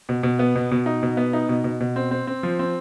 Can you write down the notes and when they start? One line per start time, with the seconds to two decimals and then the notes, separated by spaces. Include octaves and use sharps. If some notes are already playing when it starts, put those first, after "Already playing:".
0.09 B2
0.23 B2
0.39 B3
0.55 B2
0.71 B2
0.86 D#4
1.03 B2
1.17 B3
1.33 D#4
1.49 B2
1.64 B2
1.80 B2
1.96 C4
2.11 C4
2.27 C4
2.43 F3
2.59 C4